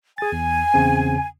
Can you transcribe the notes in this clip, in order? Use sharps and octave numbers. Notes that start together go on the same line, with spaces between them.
G#4 G#5 A6
E2
E2 C#3 C4